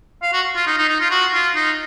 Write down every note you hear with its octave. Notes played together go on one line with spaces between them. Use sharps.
F5
F#4
F4
D#4
D#4
D#4
F4
F#4
F4
D#4